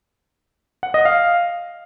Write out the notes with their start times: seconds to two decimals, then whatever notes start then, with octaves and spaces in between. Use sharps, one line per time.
0.83 F#5
0.94 D#5
1.05 F5